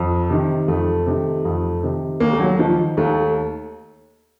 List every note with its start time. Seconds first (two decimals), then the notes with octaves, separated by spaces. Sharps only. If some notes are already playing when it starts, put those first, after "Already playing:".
Already playing: F2
0.30 C3 D#3
0.68 F2 A3
1.07 C3 D#3
1.45 F2
1.83 C3 D#3
2.20 D#2 A#3
2.33 A3
2.40 F#3
2.59 D#3 F3
2.97 D#2 A3